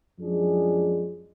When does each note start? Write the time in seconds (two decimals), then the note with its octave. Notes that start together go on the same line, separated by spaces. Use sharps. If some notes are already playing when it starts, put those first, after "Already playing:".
0.19 F#2 F3 G#3 D4 G#4